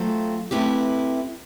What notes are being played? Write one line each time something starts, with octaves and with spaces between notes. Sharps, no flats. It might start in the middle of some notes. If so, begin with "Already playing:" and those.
Already playing: F#3 A3 C4 F4
A3 C4 E4 G4 B4